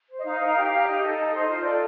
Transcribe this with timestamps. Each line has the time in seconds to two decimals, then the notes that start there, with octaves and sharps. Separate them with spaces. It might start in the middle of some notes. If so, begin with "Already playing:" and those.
0.10 C5
0.19 D#5
0.25 D#4 F5
0.41 A#4 F5
0.57 G4
0.66 F5
0.71 G4
0.83 D5
0.87 D#4 D#5
1.02 A4
1.18 D#4
1.33 C5
1.49 F4 D#5
1.62 A4 D5